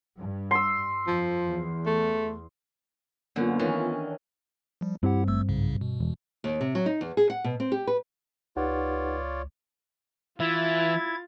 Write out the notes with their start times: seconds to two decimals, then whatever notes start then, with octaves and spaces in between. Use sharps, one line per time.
0.17 G2
0.51 C6 E6
1.07 F2 F3
1.49 E2
1.86 A3
3.36 F#2 D3 A#3 B3 F4
3.59 D#3 E3 C#4
3.95 D4
4.81 F3 G3
5.03 G2 C4 E4 G4 F#5
5.28 G#1 A3 E6
5.49 B1 G#2 C#3
5.81 B2
6.00 E1
6.44 D#2
6.61 C3
6.75 F#3
6.86 D#4
7.01 E2
7.17 G#4
7.30 F#5
7.44 B2
7.60 C4
7.72 G4
7.87 B4
8.56 C#2 D#4 F4 G4 B4 C#5 D5 F#5
10.40 E3 E4 F4 E5 G#6 A6